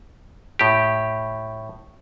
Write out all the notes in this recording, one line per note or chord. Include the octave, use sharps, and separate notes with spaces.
A2 G4